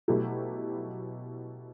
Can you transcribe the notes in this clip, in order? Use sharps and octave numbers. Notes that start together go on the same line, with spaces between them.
B2 F#3 A3 E4 G4